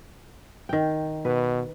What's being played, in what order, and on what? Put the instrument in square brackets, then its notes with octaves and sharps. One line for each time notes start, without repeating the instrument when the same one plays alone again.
[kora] D#3 G5
[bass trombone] B2 [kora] B4